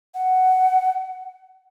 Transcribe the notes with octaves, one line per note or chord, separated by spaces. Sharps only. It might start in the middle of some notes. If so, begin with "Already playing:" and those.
F#5